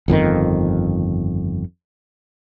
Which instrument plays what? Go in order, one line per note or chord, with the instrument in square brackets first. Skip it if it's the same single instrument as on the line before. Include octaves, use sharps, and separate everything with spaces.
[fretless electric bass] G1 F2 A2 D#3